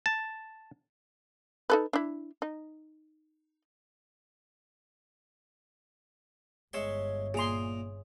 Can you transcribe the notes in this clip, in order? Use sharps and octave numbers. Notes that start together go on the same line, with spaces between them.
A5
D#4 A4 B4
D4 E4
D#4
G1 G2 G#3 C#5 E5 C6
A#2 G#4 A#5 C6